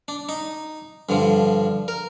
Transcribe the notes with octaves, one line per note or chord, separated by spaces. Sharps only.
D4
D#4
G2 D3 F3
A#4